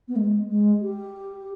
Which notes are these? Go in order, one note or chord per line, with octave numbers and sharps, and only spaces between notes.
B3
G#3
G#3
G4